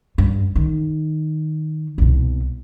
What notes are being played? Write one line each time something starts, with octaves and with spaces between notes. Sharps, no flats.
G2
D#3
C2 B2